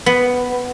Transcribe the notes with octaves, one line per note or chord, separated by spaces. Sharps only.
B3